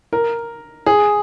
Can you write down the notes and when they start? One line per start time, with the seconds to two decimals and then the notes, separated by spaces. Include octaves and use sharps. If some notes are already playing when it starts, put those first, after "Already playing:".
0.13 A#4
0.86 G#4